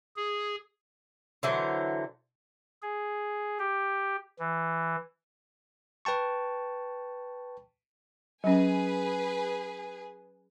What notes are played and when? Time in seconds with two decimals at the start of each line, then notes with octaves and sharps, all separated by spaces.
0.16 G#4
1.43 D3 E3 F#3 C5
2.82 G#4
3.59 G4
4.39 E3
6.05 B4 G5 A5 C#6
8.44 F#3 C#4 G#4 B4 G#5